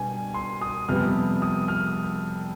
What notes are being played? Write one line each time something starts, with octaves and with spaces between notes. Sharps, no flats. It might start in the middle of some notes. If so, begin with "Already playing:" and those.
Already playing: B2 G3 D4 G#5
C6
D#6
F2 C3 G3 B3 F6
D#6
F6